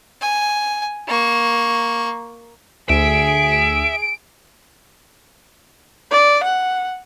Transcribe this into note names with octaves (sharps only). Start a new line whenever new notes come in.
G#5
A#3 C#6
D2 G#4 E5 D7
D5
F#5